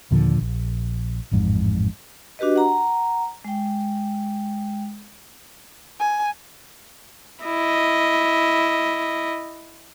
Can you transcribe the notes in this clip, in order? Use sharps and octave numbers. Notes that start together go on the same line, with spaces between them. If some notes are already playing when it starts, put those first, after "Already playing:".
D#2 A#2 D3 F3
A#1
A1 F2 G#2
D4 F#4 G4 B4 D#5
F#5 A#5
G#3 G5
G#5
E4 D#5